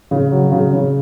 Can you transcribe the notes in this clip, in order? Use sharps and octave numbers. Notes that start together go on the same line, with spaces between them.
C#3
F#3
C#3
C#3